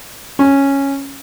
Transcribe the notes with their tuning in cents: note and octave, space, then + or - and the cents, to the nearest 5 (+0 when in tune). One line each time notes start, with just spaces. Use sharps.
C#4 -5